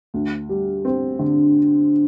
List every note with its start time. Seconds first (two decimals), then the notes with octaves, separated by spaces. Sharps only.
0.14 D2
0.49 G3
0.85 C4
1.19 D3